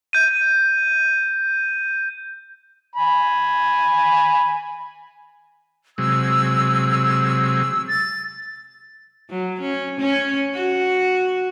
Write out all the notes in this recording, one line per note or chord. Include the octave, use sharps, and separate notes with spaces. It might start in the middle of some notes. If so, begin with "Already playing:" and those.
G6 D#7
G#5 B5
C3 F#3 G#3 E6
A6
F#3
C#4
C#4
F#4